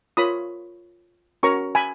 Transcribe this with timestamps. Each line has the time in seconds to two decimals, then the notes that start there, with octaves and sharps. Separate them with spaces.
0.17 F4 A#4 C#5 B5 D#6
1.43 C#4 F#4 A#4 C#5 A#5 C#6
1.75 G#5 B5